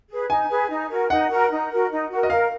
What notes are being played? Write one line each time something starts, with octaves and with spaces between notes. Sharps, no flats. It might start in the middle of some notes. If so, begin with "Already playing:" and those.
G#4 B4
D#4 G#5
G#4 B4
D#4
F#4 A#4
D#4 F#5
F#4 A#4
D#4
F#4 A#4
D#4
F#4 A#4
D#5
A#4 F5